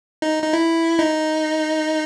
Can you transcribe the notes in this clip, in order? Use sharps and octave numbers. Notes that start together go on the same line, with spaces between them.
D#4
D#4
E4
D#4